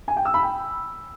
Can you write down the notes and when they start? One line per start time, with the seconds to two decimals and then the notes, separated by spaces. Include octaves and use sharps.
0.08 G#5
0.17 G5
0.25 E6
0.34 B5
0.43 G5